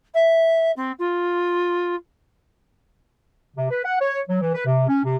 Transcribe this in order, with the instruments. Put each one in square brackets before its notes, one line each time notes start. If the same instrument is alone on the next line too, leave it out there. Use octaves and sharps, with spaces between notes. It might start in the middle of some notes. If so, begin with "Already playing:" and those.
[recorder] E5
C4
F4
[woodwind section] C3
B4
F#5
C#5
F#3
E3
B4
C3
C#4
C3